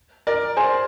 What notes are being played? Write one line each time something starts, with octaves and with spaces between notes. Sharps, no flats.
A#4 D5
G#4 C5